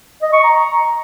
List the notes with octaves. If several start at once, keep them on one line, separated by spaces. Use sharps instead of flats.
D#5
C#6
A#5